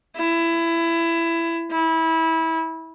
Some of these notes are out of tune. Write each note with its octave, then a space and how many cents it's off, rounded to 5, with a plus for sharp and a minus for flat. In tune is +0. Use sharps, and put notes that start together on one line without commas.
E4 +20
E4 -25